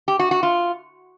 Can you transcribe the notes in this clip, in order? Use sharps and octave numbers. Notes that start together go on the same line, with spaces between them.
G4
F#4
F#4
F4